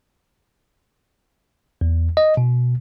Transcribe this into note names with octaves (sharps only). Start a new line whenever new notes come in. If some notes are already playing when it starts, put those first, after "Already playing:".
E2
D#5
B2